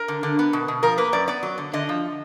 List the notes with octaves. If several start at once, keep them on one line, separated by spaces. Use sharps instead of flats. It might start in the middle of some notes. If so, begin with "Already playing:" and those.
Already playing: A#4
D3
D3
B3
B2
B2
F3 A#4
A#3 B4
F#2 D5
B3 D5
F#3
D3
D3 D#5
F3